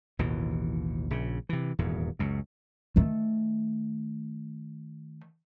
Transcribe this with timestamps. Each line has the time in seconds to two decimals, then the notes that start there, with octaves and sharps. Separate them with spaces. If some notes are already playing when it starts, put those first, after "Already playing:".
0.19 A1 D#2 B2 E3
1.11 A#1 C#3
1.49 C3 E3
1.79 D#1 E2 G#2
2.19 C#2 F#2
2.96 D#3 A3